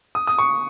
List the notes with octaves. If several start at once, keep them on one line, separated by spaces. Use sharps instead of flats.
D#6
D#6
C#6